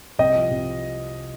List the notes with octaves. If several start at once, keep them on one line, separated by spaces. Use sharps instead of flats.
C2 D#5 G5
F3
C2